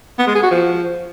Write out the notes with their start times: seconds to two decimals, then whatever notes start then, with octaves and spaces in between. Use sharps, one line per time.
0.19 B3
0.27 G#3
0.35 G#4
0.43 F#4
0.51 F3